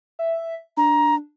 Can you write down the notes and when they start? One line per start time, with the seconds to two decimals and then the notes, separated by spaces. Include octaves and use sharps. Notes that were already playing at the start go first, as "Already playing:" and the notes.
0.19 E5
0.77 D4 A#5